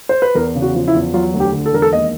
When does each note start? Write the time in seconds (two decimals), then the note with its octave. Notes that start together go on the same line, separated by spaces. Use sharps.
0.09 C5
0.22 B4
0.35 E2 A#4
0.55 C#3
0.62 F#4
0.75 F3
0.88 E4
0.94 E2
1.14 F#3 F4
1.34 D2
1.40 G4
1.53 D3
1.66 A4
1.73 E1 A#4
1.82 A4
1.92 D#2 D#5